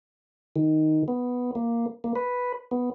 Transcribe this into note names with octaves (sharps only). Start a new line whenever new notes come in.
D#3
B3
A#3
A#3
B4
B3